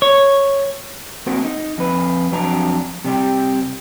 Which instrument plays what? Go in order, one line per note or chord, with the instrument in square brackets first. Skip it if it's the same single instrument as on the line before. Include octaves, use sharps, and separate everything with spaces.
[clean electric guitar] C#5
A#3 C4 F#4 A#4 C5
D#4
F2 B4
F2 F#3 D4 A#5
C3 G3 G4